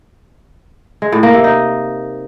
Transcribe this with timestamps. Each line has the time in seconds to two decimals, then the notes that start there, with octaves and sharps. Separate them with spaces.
1.02 G#3
1.12 A2
1.23 A#3
1.33 C3
1.44 D#4